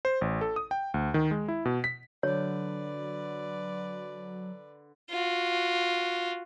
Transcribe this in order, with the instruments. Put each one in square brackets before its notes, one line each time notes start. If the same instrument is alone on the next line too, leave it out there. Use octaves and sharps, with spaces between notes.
[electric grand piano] C5
A1
A4
D#6
G5
D2
D#3
G#3
E4
B2
B6
[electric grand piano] D3 [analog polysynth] F#3 [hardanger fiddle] B4 D5 [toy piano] C#5
[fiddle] F4 F#4